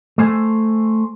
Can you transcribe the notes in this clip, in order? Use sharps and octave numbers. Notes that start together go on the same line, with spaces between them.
A3 C5 G#5